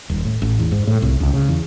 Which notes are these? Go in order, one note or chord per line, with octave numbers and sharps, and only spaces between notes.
D#1
A2
A1
E2
G#2
A2
C2
C#2
C#3
E2